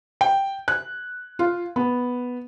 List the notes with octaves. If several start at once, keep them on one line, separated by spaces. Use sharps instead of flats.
G5
F#6
F4
B3